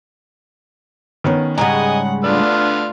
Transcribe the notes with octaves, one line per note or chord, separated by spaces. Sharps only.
D#3 B3 C#4
G#2 C#3 G3 D#5 F#5 G#5 A#5
D3 A3 B3 D4 F4 D5 F6